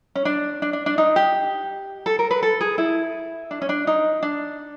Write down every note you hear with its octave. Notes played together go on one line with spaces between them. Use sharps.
C#4
D4
D4
D4
D4
D#4
G4
A4
A#4
B4
A4
G#4
E4
D4
C#4
D4
D#4
D4